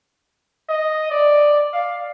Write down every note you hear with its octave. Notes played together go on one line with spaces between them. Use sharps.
D#5
D5
F5